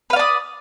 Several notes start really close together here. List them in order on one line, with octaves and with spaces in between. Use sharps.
B4 F5 D5 D#6